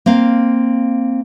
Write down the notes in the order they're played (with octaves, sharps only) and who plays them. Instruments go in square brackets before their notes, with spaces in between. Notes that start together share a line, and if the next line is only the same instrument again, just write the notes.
[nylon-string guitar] A#3 C4 F5